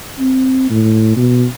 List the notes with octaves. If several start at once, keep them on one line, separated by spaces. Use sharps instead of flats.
C4
A2
B2